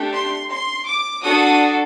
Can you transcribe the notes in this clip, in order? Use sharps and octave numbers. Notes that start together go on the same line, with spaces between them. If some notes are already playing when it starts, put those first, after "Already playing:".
Already playing: A3 D4 G4
C6
C6
D6
D4 F#4 A4 D#6